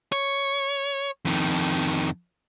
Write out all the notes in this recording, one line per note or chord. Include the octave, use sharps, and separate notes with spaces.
C#5
F2 D#3